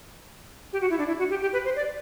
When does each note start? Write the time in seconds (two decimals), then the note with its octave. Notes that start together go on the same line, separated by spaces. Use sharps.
0.73 G4
0.81 F#4
0.90 E4
0.99 D4
1.08 E4
1.19 F#4
1.30 G4
1.41 G4
1.53 B4
1.65 C5
1.76 D5